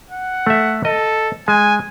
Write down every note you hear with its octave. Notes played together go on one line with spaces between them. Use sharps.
F#5
A3 E5
A4 D#5
G#3 G#5